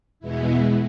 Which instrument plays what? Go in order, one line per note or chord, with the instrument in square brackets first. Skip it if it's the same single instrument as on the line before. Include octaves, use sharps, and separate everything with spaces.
[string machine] E2 B2 G#3 B3 E4